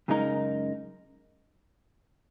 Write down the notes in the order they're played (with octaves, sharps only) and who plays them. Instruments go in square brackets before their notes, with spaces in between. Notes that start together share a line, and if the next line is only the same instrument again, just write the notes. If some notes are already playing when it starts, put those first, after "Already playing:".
[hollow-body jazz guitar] F#2 C#3 G#3 D#4 A#4